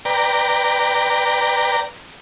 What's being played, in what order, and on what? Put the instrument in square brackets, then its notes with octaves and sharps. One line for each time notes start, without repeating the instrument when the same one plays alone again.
[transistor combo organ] B4 D5 G5 A#5